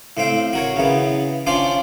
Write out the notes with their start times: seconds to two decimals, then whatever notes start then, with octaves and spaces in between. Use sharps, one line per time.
0.17 A2 C4 F5 G5
0.53 F#4 A#4 C#5
0.76 C#3 E3 B3
1.47 C#4 D4 F4 C5 D5